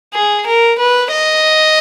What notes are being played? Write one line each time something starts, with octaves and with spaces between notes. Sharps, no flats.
G#4
A#4
B4
D#5